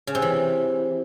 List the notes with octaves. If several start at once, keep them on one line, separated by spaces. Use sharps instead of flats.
C#3
C3
E3